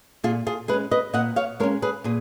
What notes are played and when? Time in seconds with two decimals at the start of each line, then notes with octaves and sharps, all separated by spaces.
0.24 A#2 F4 G#4
0.47 F4 G#4
0.68 G#3 G#4 B4
0.73 C#4
0.91 B4 D#5
1.13 A#2 D#5 F#5
1.36 C#5 F5
1.60 G#3 A#4 C#5
1.63 C#4
1.82 G#4 B4
2.04 A#2 G#4